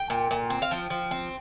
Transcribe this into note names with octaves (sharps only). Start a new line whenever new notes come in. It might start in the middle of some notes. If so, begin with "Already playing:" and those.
Already playing: G5
A#2
A#2
C4
F5
F3 G5
F3
C4